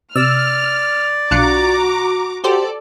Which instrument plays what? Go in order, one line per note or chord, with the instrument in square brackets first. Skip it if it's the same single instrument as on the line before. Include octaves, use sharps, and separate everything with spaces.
[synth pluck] C3 [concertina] D5 [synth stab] E6 [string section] F6
[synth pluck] B1 F#6 C#7 [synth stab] D4 F4 [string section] F#4 A#5 D6
[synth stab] F#4 G4 C5 [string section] A4 D5